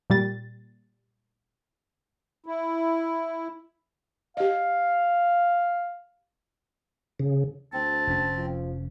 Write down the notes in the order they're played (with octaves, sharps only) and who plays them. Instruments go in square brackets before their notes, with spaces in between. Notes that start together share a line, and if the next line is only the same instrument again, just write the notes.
[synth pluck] A#2 G3 A6
[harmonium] E4
[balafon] G4 D#5 [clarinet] F5
[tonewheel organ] C#3
[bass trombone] D2 [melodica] C4 [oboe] A5
[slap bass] F1 C#4
[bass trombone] F3